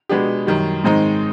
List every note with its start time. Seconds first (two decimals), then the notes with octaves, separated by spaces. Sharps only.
0.09 B2 G#3 B3 D4 G4
0.47 F#2 D#3 G3
0.84 G#2 D#3 G#3 C4 D#4